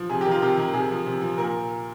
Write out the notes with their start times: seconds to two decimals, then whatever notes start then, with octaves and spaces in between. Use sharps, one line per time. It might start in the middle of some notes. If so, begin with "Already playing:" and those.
Already playing: F3
0.09 C3 G#4
0.21 G4
0.25 D#3
0.31 F4
0.42 C3 G4
0.57 D#3
0.74 C3 G#4
0.90 F3
1.06 C3
1.21 F3
1.38 A#2 A#4